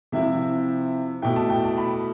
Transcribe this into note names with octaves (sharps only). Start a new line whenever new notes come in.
C3 F3 C4 E4 E5
B2 A3 E4 G5
A5
G5
A5
B5